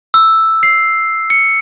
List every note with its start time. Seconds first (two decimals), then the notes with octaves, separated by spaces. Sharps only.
0.14 E6
0.63 C7
1.30 C#7